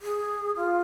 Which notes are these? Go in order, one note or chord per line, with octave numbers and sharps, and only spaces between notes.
G#4
F4